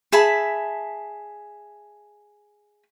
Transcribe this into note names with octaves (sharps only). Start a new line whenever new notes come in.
G#4 E5 A5 B5